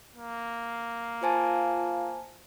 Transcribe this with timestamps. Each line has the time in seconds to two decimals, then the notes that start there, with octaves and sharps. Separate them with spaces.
0.16 A#3
1.23 F4 C5 G#5 A5